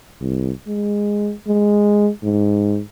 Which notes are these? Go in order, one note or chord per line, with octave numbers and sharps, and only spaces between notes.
C2
G#3
G#3
G#2